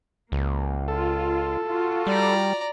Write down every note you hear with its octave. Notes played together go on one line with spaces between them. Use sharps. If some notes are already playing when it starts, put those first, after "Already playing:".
C#2 A#3
F4 A4
F4 F#4
G3 D5 A#5